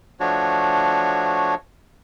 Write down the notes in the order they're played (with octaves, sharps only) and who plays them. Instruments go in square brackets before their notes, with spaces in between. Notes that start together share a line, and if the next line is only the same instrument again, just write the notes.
[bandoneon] F3 A3 D4 F#4 C#5